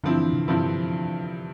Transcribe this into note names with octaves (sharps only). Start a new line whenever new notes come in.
G2 D3 F3 C4 E4
E3
C3
G2 D3 F3 C4 E4
F3